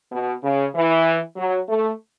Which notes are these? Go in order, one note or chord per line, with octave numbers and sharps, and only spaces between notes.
B2
C#3
E3
F#3
A3